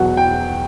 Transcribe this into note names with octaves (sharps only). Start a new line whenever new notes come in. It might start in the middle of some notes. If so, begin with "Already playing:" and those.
Already playing: E2 B2 F#3 F#5
G5